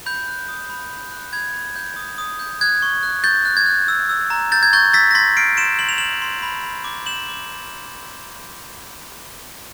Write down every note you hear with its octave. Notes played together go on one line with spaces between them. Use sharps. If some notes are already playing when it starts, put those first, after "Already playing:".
B5 G6
F#6
D#6
B5
B5
F#6
B5 G#6
B5
G6
D#6
D#6
G6
F#6 G#6
C#6
F#6
C#6 G6 A6
F#6
G#6
F#6
E6
E6
A#5
G6 A6
G#6
C#6 G6 A6
E6 A6 B6
A#6
C6 A6 B6
F6 C7 D7
C6 D7 E7
C6 F#7
F7
F6 E7 F#7
C6
B5
B5
D6
G6 E7 F#7
D6